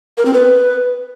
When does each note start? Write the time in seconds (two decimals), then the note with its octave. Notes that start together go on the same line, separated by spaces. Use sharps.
0.18 A#4
0.26 C4
0.34 B4